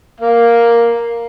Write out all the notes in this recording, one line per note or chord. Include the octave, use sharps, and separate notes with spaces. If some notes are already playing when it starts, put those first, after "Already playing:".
A#3 F5